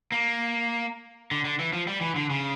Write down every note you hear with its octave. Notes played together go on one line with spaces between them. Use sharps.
A#3
D3
D3
E3
F3
G3
E3
D3
C#3